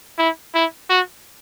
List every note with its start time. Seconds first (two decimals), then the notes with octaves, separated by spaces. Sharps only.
0.19 E4
0.54 E4
0.90 F#4